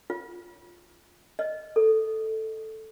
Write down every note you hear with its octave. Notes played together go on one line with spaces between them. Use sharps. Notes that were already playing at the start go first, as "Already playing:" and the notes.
F4
D#5
A4